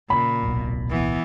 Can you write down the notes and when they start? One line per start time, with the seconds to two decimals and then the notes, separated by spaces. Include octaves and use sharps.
0.10 A#2 C#3 B5
0.43 D1 B1 B2
0.90 E3 B3